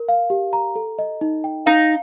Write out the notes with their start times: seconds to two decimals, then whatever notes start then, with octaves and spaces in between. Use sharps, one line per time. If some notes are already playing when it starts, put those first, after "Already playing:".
Already playing: A#4
0.08 F5
0.30 G4
0.53 A#5
0.76 A4
0.99 D#5
1.21 D#4
1.44 G5
1.66 D#4 F5